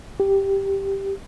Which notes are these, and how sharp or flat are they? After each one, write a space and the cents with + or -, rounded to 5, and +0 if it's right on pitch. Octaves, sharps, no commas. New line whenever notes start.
G4 +0